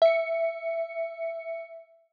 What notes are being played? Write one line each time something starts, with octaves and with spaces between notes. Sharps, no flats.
E5 C#7